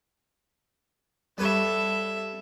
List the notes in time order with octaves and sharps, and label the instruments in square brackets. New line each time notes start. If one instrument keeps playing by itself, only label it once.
[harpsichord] G3 B4 C#5 [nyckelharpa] A4 E5